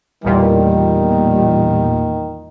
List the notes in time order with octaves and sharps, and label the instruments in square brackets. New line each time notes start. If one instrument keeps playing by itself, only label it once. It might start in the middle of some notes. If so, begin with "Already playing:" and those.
[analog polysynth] A1 E2 A#2 [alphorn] D#3 [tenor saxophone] G3